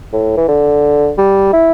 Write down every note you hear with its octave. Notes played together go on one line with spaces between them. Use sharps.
A2
E3
D3
G3
E4